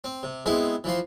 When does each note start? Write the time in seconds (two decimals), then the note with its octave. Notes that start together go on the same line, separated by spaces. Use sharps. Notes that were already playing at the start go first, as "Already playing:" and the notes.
0.04 C4
0.23 C3
0.46 G#3 B3 C4 E4 G#4
0.84 E3 F3 C6